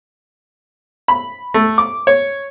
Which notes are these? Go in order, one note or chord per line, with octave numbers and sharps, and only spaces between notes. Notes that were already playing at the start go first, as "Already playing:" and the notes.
B5
A3
D6
C#5